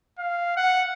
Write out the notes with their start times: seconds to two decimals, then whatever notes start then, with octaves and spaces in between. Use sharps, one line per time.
0.19 F5
0.57 F#5